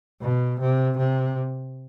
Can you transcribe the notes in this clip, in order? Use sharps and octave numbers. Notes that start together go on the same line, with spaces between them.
B2
C3
C3